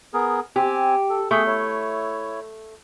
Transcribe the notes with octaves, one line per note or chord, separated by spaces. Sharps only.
B3 G#4 A#4
C4 G4 G#5
A4
A3 G#4
E4 C#5